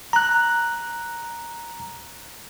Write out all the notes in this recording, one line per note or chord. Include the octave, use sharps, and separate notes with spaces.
A#5 F#6